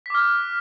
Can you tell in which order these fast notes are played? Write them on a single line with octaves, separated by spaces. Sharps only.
B6 D6 F6 F#6